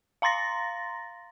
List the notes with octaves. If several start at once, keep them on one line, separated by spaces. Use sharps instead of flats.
F5 A#5 C6 A6 A#6